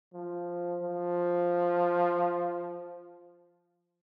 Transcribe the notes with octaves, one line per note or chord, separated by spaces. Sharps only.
F3
F3